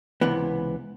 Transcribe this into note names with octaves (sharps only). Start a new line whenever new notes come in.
C#2 C3 E3 B3